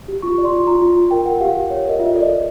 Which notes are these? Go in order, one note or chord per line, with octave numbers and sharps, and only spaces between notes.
G4
F4 C#6
D5
C6
F4
F4 A#5
F4
F4
A#4 G5
A#4 F#5
G4 F5
G4
C#5
A#4 D#5
F4 E5
A4 D5
D#5
A4